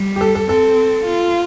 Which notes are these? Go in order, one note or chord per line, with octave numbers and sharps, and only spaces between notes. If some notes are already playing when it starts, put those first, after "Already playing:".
Already playing: G3
G4
A4
A4
C4 A4
F4